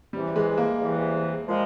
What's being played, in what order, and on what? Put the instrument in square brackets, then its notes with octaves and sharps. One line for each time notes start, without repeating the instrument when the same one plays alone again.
[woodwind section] E2 C3 E3 [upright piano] G3
[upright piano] G#3
A#3
[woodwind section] E2 C3 E3
A#2 F3 G#3